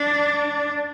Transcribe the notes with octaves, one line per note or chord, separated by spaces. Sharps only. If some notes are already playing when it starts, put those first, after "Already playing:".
Already playing: D4